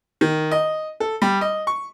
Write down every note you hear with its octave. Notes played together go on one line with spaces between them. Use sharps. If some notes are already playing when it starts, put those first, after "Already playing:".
D#3
D#5
A4
G3
D#5
C#6